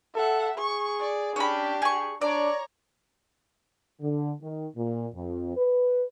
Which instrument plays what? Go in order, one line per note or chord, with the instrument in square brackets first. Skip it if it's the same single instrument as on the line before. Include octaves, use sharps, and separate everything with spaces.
[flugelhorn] A4 [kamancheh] E5 F#5
[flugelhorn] G#4 [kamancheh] C#6
[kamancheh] D5
[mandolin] C#4 B5 [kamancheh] D4 G4
[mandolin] G#4 C#6
[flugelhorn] D4 [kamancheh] C#5 A#5 [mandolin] D5
[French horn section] D3
D#3
A#2
F2
B4